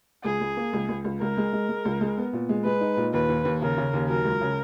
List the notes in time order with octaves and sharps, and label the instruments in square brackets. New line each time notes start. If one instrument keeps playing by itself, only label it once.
[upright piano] C#2 [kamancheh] G#4
[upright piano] C#2
A#3
C#2
C#2
C#2
[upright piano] C#2 [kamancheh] A#4
[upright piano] G#3
G#3
G#3
C#2
G#3
B3
A#2
G#3
[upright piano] G#3 [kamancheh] B4
[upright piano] D#4
A#2
[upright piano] D#2 [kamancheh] B4
[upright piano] D#2
D#2
[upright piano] C#3 [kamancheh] A#4
[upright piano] C#3
D#2
[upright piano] F#3 [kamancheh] A#4
[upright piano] C#2
C#3